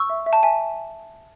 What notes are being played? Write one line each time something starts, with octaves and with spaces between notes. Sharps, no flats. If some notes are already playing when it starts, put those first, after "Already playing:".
Already playing: C#6 E6
E5
E5
A5
E5 G#5